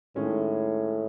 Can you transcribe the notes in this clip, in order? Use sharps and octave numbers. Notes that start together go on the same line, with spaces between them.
A2 D#3 G#3 C#4